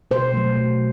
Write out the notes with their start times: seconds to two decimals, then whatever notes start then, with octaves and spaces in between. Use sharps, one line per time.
0.11 B2 C5
0.34 F#3 A3
0.57 B2